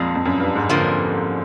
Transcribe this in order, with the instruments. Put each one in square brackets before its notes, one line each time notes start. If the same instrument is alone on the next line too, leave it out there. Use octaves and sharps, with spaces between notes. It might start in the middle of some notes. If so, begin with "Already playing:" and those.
Already playing: [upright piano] F2 [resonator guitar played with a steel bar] A#2 F3 G#3
[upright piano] F2
F#2
G2
G#2
[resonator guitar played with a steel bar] F2 D3 F3 A#3